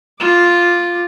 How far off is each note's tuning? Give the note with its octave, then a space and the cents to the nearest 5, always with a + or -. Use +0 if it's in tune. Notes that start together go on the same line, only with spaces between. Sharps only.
F4 +0 D6 +0